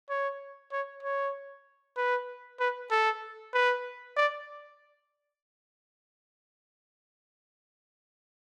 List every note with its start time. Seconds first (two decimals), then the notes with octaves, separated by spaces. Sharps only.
0.10 C#5
0.72 C#5
1.03 C#5
1.97 B4
2.60 B4
2.91 A4
3.54 B4
4.17 D5